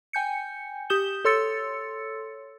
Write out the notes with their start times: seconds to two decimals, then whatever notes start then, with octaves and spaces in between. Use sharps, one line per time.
0.13 G5 G#5 G6 C#7
0.90 G4 D#6 G6 E7 G7
1.25 A4 C#5 C6 E6 A6 C#7